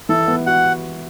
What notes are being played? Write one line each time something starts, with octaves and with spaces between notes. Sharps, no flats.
E3 A4
B3
F#4 F#5